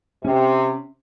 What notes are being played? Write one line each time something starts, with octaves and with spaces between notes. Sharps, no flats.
C3 C#4